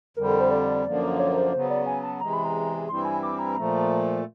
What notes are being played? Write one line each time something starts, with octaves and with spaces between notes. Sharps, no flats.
F2 D3 G3 A#4
A#4
C5
D5
F#2 D3 F3 A#3
C#5
C5
C#3 F#3 B3 C5
D5
G#5
A5
E2 C3 E3 G#3 A#5
B5
A#5
G2 E3 G3 C4 E4 C6
G#5
D6
A#5
A#2 F3 A3